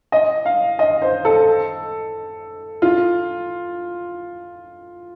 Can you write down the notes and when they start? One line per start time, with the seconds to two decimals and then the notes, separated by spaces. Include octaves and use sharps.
0.12 D#5
0.46 F5
0.79 D#5
1.02 C5
1.25 A4
2.82 F4